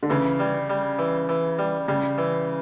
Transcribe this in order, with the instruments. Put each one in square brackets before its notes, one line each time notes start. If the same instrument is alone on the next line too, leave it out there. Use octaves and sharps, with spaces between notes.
[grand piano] D3
[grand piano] C#3 [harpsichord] E3
[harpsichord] G3
G3
E3
E3
G3
[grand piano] C#3 [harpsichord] G3
[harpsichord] E3